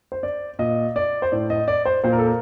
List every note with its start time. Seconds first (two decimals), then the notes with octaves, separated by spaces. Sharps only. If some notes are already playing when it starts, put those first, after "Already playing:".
0.12 C5
0.23 D5
0.59 A#2 D#5
0.96 D5
1.22 C5
1.32 A2 D5
1.50 D#5
1.68 D5
1.85 C5
2.04 A#2 C5
2.12 A#4
2.18 A4
2.26 A#4